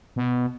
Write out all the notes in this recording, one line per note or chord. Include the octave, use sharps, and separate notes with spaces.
B2